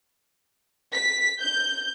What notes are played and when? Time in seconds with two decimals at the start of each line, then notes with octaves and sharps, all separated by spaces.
0.95 B6
1.41 G6